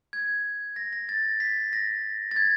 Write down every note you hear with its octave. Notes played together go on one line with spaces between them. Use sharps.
G#6
A#6
A#6
A6
B6
A#6
A6
G#6